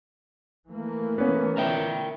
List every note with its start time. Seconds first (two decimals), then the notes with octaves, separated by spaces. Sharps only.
0.68 E3 A3 A#3
1.18 B3 C#4
1.57 A#4 E5 G5